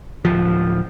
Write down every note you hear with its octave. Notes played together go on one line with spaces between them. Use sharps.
D1 F3